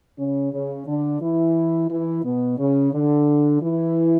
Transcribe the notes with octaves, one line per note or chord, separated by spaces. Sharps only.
C#3 C#4
C#3 C#4
D3 D4
E3 E4
E3 E4
B2 B3
C#3 C#4
D3 D4
E3 E4